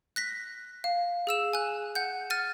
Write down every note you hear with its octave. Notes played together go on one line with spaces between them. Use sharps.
F#6 A#6 B6
F5
G#4 E6 E7
G#5 F#6
F#5 G6
F6 A6 D#7